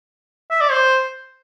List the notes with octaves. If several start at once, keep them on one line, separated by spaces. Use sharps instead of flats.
E5
D5
C5